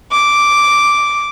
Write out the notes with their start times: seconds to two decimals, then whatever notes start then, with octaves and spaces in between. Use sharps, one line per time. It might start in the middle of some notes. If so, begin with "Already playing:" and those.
0.11 D6